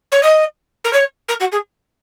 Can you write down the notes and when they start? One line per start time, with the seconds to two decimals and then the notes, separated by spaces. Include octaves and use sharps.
0.11 C#5
0.23 D#5
0.84 A#4
0.93 C#5
1.28 A#4
1.40 F#4
1.52 G#4